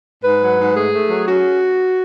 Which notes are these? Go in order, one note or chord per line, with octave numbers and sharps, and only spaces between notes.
G#2 B4
F#3
G#2
A3 G#4
A3
F#3
C#4 F#4